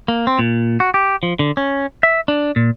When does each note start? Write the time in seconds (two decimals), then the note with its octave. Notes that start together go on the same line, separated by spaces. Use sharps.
0.08 A#3
0.27 C4
0.39 A#2
0.80 F#4
0.94 G4
1.23 F3
1.39 D3
1.57 C#4
2.03 E5
2.28 D4
2.56 A#2